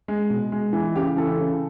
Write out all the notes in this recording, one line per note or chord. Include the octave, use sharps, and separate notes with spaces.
G#3
B2
G#3
E3
C#3 G4
E3 A4
C#3